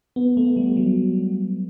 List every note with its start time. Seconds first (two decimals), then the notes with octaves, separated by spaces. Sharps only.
0.16 B3
0.37 A3
0.57 G3
0.77 F#3